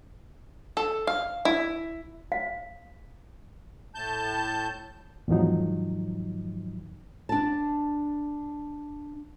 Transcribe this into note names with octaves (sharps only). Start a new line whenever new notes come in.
A4
F5
E4
F5
A2 A5 G6
E2 G#2 D#3 F3 F#3 D#4
D4 A5